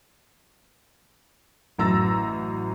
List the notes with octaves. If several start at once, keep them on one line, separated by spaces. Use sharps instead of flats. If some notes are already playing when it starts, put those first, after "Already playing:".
A1 F#2 A#5 E6 A6 A#6